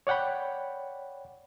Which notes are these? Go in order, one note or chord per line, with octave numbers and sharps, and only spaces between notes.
C#5 D5 F#5 G5 B5